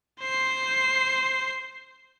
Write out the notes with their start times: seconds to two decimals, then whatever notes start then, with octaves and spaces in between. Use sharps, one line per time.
0.20 C5 C7